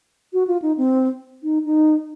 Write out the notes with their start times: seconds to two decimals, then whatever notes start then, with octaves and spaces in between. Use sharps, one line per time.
0.33 F#4
0.47 F4
0.62 D#4
0.77 C4
1.43 D#4
1.65 D#4